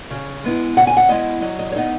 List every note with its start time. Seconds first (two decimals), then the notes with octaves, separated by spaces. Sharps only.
0.10 C#3
0.44 G#3 B3 E4
0.77 C#3 F#5
0.87 G#5
0.97 F#5
1.09 G#3 B3 E4 D#5
1.42 F#3 D#5
1.59 D#5
1.72 C#5
1.75 B3 D#4 D#5